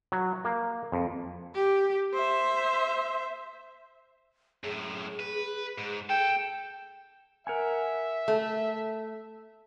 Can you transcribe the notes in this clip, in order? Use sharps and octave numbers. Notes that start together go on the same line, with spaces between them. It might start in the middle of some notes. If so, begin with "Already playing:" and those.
F#3
A#3
F2
G4
C5 E5
F#2 A2 G#4
B4
G#2
A4 G5
A#4 E5 F#5 G#5
A3